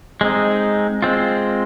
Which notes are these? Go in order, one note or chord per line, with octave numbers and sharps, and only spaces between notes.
G#3 C4 D#4
G#3 C4 F4